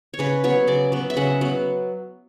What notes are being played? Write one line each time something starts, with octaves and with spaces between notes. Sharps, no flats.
C#5
C#3 B4
F#3 B3 C#5
C#3 D5
F#3 B3
E5
C#3 F#5
F#3 B3